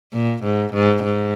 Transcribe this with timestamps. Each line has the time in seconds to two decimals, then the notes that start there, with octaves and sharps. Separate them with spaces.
0.13 A#2
0.44 G#2
0.74 G#2
1.04 G#2